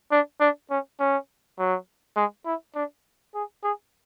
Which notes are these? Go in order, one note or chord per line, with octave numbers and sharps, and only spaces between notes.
D4
D4
C#4
C#4
F#3
G#3
E4
D4
G#4
G#4